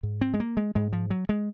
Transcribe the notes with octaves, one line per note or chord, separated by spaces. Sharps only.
G#2
C4
G#3
A#3
G#3
G#2 G#3
F3
F#3
G#3